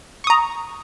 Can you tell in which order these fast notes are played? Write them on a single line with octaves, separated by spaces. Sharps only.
C#6 D#6 A#5